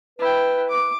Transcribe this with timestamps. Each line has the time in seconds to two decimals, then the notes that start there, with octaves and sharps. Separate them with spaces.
0.19 E4 B4 G5
0.69 D6